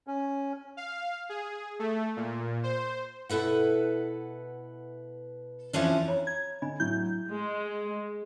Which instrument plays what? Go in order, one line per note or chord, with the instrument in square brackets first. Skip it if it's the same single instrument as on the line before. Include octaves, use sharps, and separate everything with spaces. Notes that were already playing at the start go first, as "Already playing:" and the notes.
[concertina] C#4
[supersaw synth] F5
G#4
A3
A#2
C5
[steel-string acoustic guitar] B2 E4 A4 B4 F#5
F2 G#2 E3 F3 C#4 D4
[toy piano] C#5 A#5 B5
[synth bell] G#6
[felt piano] D3 [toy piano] D#5 G#5 B5
[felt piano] A2 F#3 [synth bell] G6
[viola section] G#3